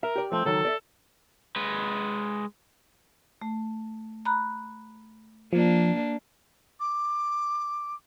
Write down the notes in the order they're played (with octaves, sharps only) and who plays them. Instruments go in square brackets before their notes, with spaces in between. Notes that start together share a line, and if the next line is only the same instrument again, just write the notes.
[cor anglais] A#4 [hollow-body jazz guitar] E5
[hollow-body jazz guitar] G4 D5
[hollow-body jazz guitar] F3 A3 [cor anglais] C4
[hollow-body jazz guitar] C#2 D#3 F#3 [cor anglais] A4
[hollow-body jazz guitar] D5 E5
[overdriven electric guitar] G#3 B4
[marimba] A3
A#5 B5 F#6
[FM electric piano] F3 [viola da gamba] A#3 D4
[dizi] D6